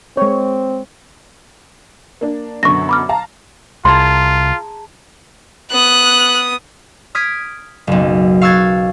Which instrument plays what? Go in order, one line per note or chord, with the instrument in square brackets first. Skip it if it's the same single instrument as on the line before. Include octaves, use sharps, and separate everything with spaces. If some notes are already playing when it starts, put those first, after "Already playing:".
[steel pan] G#3 C#5 [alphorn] C4
[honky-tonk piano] A#3 D4
[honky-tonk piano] F#2 B2 D3 [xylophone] C#6 A#6
[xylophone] B5 D6 F6
[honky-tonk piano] F5 A5 A#5
[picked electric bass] C2 [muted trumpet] F4 [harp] G#4 A5 A#5 [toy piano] C6
[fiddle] B3 D#6 [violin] F#6
[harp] D#6 F6 G#6 B6 D7
F#1 B1
F5 C#6 E6 F#6 G#6 A6